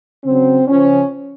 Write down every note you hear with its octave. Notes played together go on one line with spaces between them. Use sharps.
C#3 F#3 C4
C#3 F3 C#4